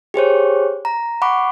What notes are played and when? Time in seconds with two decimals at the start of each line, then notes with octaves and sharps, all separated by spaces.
0.14 G4 G#4 C5 C#5
0.85 A#5
1.22 F#5 B5 C#6 D6